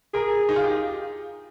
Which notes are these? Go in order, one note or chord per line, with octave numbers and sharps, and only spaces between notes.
G#4 A#4
D#4
F4
G4